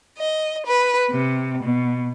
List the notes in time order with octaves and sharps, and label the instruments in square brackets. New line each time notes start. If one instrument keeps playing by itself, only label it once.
[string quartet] D#5
B4
C3
B2